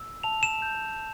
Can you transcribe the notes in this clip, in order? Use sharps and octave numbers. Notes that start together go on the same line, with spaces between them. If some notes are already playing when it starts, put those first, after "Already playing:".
Already playing: E6
A5 F7
E7
G6